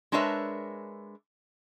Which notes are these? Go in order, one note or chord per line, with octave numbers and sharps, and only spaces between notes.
G#3 D4 A#4 B4 C#5 E5